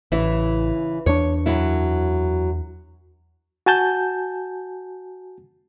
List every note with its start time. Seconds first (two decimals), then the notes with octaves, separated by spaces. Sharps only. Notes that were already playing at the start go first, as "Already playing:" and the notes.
0.12 A1 C#3 E3 E4
1.06 E2 D4 C#5
1.46 F#2 F#3 E4
3.66 F#4 G#5 A5 G6